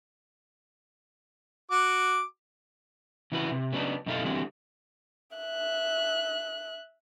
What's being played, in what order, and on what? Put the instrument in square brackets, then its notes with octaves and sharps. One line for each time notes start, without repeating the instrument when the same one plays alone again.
[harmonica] F#4 D6
[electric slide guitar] C#3 E3 E4 F#4 B4
C3
C#3 F#3 B3 D4 D#4
F#2 B2 D#4 E4 A4 F5
D3 E3 G3 C4 F#4
[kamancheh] E5 F#6